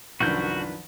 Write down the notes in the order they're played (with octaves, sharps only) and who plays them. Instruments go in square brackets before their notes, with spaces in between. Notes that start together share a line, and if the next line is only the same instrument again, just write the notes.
[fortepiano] C2 [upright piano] F#2 D#3 F3 [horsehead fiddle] D4 B4 [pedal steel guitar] F#4 G6